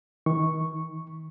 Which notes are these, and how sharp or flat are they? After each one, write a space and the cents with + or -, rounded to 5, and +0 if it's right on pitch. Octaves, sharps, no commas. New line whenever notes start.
D#3 +35 C#6 -5